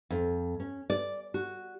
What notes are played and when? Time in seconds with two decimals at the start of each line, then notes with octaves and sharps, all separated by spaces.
0.10 F2
0.60 C#4
0.90 D5
1.34 F#4